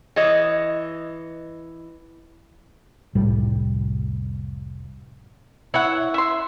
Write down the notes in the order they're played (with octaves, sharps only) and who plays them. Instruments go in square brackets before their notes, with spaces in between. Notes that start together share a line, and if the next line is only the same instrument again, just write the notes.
[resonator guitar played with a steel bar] E3 C#5 D#5
[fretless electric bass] F1 C2 A2 G3
[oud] E4 [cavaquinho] C#5 F#5
[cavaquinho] E5 C6